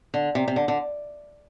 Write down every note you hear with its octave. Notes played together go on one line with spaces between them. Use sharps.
D3
C3
C3
D3
D3